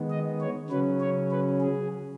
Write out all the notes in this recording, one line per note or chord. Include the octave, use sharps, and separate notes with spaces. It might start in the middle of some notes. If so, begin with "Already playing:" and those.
Already playing: D#3 G#3 B3
D#5
C#5
C#3 F#3 C#4 B4
C#5
B4
G#4